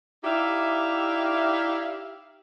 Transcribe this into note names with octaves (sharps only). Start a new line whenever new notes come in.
D#4 E4 G4 D5 E5 F5